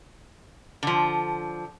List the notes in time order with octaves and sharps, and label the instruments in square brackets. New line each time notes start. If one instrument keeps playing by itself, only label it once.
[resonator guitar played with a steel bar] D3 F3